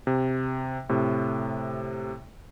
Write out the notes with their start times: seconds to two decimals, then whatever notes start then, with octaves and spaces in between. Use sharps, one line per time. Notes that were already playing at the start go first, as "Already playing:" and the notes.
0.07 C3
0.89 A2 C3